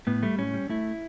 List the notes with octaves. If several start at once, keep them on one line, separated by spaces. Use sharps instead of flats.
A2 B3
G3 A3
A2 C#4
G3
A3 E4